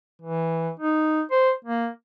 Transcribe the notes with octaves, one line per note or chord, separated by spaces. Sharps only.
E3
D#4
C5
A#3